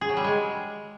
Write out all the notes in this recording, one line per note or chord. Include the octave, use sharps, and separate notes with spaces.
G#4
F#3
G3
G#3